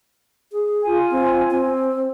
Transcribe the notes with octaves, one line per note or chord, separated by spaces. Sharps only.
G#4
F4 G#5
C4
C4